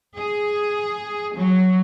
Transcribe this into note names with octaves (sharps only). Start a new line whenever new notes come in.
G#4
F#3